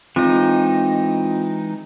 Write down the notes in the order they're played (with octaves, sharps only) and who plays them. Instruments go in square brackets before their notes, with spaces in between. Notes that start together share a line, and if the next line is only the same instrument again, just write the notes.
[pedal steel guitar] E3 G#3 D#4 [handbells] C4 F4